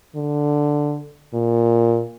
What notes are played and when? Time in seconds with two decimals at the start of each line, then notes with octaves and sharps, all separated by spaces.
0.15 D3
1.33 A#2